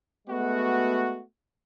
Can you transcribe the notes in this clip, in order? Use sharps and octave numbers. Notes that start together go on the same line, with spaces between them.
G#3 A3 B3 F#4